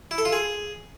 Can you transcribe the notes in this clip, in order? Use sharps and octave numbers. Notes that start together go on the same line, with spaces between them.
E4
A4
F4
G#4